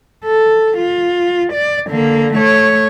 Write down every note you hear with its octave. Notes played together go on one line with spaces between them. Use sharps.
A4
F4
D5
D3 A#3
A3 C#5